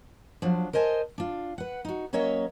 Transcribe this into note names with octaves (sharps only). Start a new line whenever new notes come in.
F3 F#3 D4 F4
A#4 C5 D#5 G#5 A5
D4 F4
B4 F#5
D#4 F#4
F#3 A#3 C#4 C#5 D#5 E5